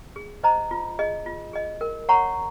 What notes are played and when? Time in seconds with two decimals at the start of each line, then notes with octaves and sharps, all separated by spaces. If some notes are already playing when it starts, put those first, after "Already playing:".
0.16 G#4
0.44 C5 D#5 A#5
0.71 F4
0.99 G#4 D#5
1.26 F4
1.53 G#4 D#5
1.81 A#4
2.09 C#5 F#5 A#5 C#6